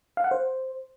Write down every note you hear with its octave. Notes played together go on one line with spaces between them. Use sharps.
F5
F#5
C5